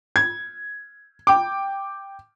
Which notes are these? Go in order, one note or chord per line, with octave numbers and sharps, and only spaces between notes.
G#6
G5 D6